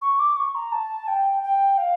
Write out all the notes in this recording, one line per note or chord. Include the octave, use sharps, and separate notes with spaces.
C#6
D6
C#6
A#5
A5
G5
G5
F5